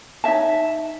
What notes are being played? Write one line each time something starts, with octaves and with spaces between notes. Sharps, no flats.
D#4 C#5 E5 A5